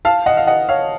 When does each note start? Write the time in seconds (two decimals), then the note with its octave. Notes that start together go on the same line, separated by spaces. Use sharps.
0.05 F5 A5
0.26 D#5 F#5
0.37 F5
0.47 D#5 F#5
0.69 C#5 F5